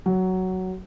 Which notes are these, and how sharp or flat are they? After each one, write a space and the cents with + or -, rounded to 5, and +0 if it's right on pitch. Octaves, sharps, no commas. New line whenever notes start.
F#3 +10